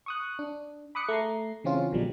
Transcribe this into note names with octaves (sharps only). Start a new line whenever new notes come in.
C#6 D#6 F#6
D4
B5 D6 D#6 F#6 C#7
A3 A#5 C7
C#3 E3 C4 C#4 F4
A#1 B2 D3 F3 G3 G#3